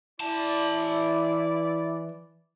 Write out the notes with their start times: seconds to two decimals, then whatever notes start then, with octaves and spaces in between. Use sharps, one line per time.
0.21 E3 E4 D5 A5